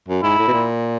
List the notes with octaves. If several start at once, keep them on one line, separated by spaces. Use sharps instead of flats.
F#2
G#2 E4
A2
B2
A#2